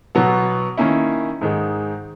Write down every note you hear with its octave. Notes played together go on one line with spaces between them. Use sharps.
B2 F#3 B3
D#3 A#3 C#4 E4
G#2 D#3 G#3